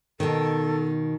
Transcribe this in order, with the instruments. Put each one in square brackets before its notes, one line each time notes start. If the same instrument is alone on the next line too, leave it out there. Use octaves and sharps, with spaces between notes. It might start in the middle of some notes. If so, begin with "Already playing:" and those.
[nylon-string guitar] B2 D#3 [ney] A4